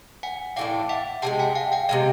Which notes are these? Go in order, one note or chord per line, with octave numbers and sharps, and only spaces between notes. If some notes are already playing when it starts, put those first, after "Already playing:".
F#5 G#5
A2 E3 A3 D4 F5 G5
E5 F#5
C3 E3 G#3 G5 A5
F#5 G#5
F5 G5
F5 G5
C3 E3 G#3 D#5 F5